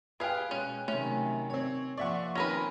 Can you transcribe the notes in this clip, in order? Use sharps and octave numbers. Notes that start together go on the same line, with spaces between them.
G4 G#4 B4 F5 G5 F#6
B2 G#3 C#4
C3 D#3 F#3 A3 C#4
C4 C#5 G#6
F3 A#3 D5 E5 F#5 C#6
D#3 C4 C#4 D#4 A#4 B4 A#6 D#7